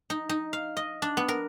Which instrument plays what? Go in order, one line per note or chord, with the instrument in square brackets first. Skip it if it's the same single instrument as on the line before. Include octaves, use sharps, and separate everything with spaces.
[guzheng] D#4
D#4
F5
D#5
D4
B3
A#4